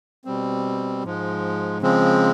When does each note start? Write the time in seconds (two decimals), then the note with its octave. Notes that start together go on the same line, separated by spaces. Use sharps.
0.25 B2 G3 C4
1.03 G#2 F3 G#3
1.82 C#3 F3 G#3 C4